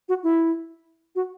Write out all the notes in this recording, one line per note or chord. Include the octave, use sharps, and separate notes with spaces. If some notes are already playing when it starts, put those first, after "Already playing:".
F#4
E4
F#4